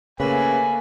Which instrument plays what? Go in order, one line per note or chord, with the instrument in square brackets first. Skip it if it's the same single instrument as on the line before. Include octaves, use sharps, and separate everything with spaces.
[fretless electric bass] C#3 [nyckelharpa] A3 A#3 [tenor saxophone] B4 [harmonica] G#5